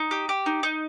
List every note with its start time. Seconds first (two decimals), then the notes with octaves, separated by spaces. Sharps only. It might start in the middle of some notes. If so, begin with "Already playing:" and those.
Already playing: D#4
0.11 G4
0.29 G4
0.46 D#4
0.63 D#4